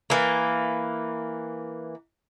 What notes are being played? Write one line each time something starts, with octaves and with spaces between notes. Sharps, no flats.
E3 A#3